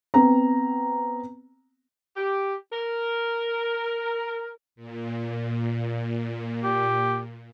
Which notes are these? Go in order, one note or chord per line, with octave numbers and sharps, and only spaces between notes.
B3 C4 A#5
G4
A#4
A#2
G4